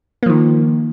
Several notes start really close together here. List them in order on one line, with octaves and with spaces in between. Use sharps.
A#3 F3 D#3